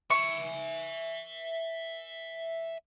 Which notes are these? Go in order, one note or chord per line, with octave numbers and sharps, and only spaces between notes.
E5 G#5 C#6